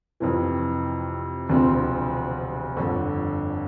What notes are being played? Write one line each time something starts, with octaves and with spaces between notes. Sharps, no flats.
F2 C3 E3
E1 D2 C3 F3 C4
G1 F2 D3